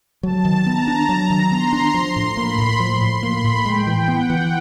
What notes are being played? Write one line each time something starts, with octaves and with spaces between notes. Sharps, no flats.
F#3 A5
D#3
B3 A#5
D4
F#3 A#5
D#3
B3 C6
D4
F3
A2
A#3 B5
A2
F3 C6
A2
A#3 B5
A2
G#3 G5
E3
B3 F#5
E3